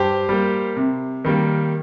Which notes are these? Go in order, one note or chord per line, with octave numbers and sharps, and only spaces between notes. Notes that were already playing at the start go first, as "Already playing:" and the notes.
Already playing: G2 G4 C5
G3 A#3
C3
D#3 G3 A#3